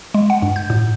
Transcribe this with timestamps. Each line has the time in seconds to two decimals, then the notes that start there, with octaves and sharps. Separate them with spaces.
0.14 G#3
0.30 F#5
0.42 G2
0.56 G6
0.70 A2